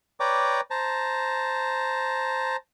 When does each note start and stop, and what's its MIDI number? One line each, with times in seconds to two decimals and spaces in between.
0.20 0.61 71
0.20 0.61 73
0.20 0.61 74
0.20 0.61 79
0.20 0.61 82
0.20 0.61 86
0.71 2.56 72
0.71 2.56 81
0.71 2.56 82